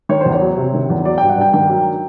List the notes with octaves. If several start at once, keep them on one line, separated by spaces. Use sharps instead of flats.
D#3 C#5
E2 C5
C#5
F#3
C3
D#3
E2
F#3 D5
G5
G2
F#5
G2 G5
D#3 G5
F#3